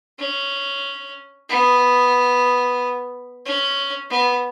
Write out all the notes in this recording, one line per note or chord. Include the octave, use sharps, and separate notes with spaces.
C#4
B3
C#4
B3